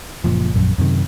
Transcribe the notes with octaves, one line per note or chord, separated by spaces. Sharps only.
F#1 A#2 F3
A#1 F#2
F#2 C3 D#3